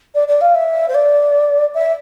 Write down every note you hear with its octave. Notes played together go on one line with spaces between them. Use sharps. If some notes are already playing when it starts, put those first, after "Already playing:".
D5
D5
F5
E5
C5
D5
E5